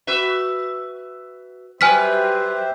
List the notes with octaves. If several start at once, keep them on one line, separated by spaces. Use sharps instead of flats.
F#4 B4 E5
F#3 G4 B4 C5 E5 G#5 F6 B6